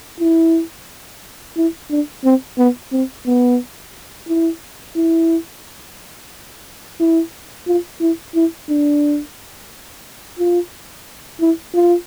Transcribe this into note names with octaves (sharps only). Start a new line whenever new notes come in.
E4
E4
D4
C4
B3
C4
B3
E4
E4
E4
F4
E4
E4
D4
F4
E4
F4